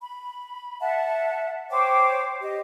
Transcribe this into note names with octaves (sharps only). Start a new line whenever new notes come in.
B5
E5 F#5 A5
C5 C#5 G5 D6
G4 D#5